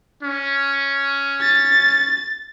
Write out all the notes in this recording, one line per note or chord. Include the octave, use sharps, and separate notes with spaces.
C#4
A6